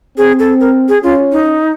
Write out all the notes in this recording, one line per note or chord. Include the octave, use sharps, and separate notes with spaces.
C4 G#4
A4
A#4
G#4
C#4 F4
D#4